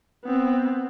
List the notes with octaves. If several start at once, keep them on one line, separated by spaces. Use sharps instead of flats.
B3 C4